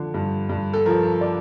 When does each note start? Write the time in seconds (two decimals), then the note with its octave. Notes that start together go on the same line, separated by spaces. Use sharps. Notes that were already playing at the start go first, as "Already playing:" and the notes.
Already playing: D3 F3
0.14 G2
0.49 G2
0.73 A4
0.86 F3 A#4
1.21 D5